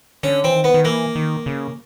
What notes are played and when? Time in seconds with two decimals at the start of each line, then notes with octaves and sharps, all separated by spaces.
0.23 D3 C#4
0.44 E3 C4
0.54 D#3
0.64 B3
0.74 D#3
0.85 E3 A#3
1.15 D#3
1.46 C#3